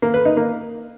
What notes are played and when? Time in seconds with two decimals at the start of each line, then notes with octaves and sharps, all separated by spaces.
0.02 A#3
0.14 B4
0.25 D#4
0.37 A#3